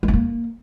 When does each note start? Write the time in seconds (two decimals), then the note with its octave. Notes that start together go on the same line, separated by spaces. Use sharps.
0.03 G#3
0.08 B3
0.13 A#3